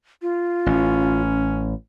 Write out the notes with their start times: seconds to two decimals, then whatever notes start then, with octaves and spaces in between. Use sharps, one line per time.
0.22 F4
0.66 A1 C#4